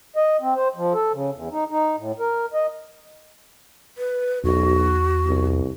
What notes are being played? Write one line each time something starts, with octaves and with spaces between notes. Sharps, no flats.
D#5
C4
C5
F3
A4
C#3
E2
D#4
D#4
A2
A#4
D#5
B4
B1 E2 F#4
C2